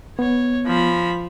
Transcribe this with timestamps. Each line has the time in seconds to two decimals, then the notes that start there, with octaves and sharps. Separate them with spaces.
0.19 B3 C#5
0.67 F3 B5